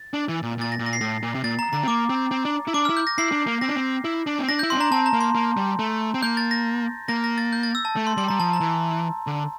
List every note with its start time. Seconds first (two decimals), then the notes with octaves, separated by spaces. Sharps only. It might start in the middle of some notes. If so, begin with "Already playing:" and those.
Already playing: A6
0.14 D4
0.28 E3
0.42 A#2
0.58 A#2 A6
0.72 A#6
0.79 A#2
0.86 A#6
0.93 C7
1.01 A2 A#6
1.23 A#2
1.35 C3
1.44 A#2 A6
1.59 A#5
1.73 D3 A#5
1.83 C4
1.88 A#3 D6
2.09 C4
2.31 C4
2.45 D4
2.67 E4
2.74 D4 D6
2.85 E4 F6
2.97 G6
3.07 A#6
3.18 E4 C7
3.32 D4
3.47 A#3
3.61 C4 A#6
3.69 D4
3.76 C4
4.05 E4
4.27 D4
4.39 C4
4.48 D4 A#6
4.59 E4 G6
4.70 C4 C6
4.77 D4 A#5
4.92 C4 A5
5.06 A#5
5.13 A#3
5.20 C6
5.35 A#3
5.57 G3
5.79 A3
6.14 C4
6.23 A#3 G6
6.37 A6
6.51 A#6
7.08 A#3 A#6
7.24 A#6
7.38 A6
7.53 G6
7.63 A6
7.75 E6
7.85 A5
7.96 A3
8.07 C6
8.17 G3 C6
8.29 G3 A#5
8.40 F3 A5
8.53 A#5
8.61 E3
9.27 D3